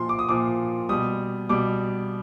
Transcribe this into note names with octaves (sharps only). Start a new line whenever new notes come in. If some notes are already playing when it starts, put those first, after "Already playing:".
Already playing: A#2 F3 C6
D6
D#6
A#2 F3 D6
B2 G3 D#6
B2 G3 D6